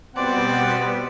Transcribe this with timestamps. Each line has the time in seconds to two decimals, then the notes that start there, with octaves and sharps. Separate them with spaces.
0.16 B2 G3 B3 C4 F4 B4 D5 F#5